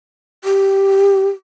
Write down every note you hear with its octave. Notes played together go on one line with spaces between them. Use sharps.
G4